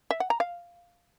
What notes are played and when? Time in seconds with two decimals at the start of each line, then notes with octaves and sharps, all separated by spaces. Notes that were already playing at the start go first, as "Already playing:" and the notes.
0.11 E5
0.20 F#5
0.30 A#5
0.40 F5